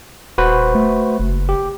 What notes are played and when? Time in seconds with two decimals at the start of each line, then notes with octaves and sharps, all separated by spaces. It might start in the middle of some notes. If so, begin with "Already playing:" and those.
0.38 D#1 F#4 B4 C5
0.75 A3
1.20 F#1
1.49 G4